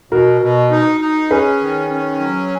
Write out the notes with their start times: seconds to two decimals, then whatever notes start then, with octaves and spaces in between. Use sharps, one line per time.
0.11 B2 F#4 A#4
0.42 B2
0.71 D#4
1.01 D#4
1.31 C#4 G#4 B4
1.61 D#3
1.91 C#4
2.20 F#3